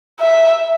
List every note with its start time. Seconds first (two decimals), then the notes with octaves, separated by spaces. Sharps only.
0.20 E5